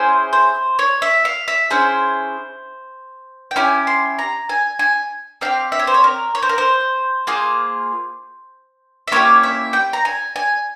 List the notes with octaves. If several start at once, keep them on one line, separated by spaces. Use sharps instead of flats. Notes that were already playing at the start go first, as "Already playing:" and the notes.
Already playing: C#4 E4 G#4 C5
C5
C#5
E5
F5
E5
C#4 E4 G#4 C5
G5
C#4 E4 G4 G#5
C6
A#5
G#5
G#5
C4 E4 G4 F5
E5
C#5
C5
C#5
A#4
C#5
C5
A#4
C5
A#3 F4 G#4
E5
A#3 C#4 E4 G4 C#5
E5
G5
A#5
G#5
G#5